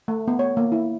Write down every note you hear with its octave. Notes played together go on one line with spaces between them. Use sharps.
A3
B3
C#5
A#3
E4